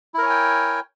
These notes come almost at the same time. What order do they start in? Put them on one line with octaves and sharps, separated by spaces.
E4 A#4 C#5 G#5 G5